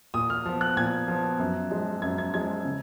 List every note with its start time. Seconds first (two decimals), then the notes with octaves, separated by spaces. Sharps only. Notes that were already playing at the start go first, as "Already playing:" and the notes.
0.14 A#2 D#6
0.30 F6
0.46 F3 B3
0.61 F#6
0.77 A#2 G#6
1.08 F3 B3
1.40 F#2
1.71 F3 G#3
2.02 F#2 G#6
2.18 G#6
2.33 F3 G#3 G#6
2.65 C#3